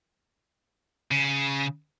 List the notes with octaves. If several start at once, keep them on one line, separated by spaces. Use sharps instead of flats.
C#3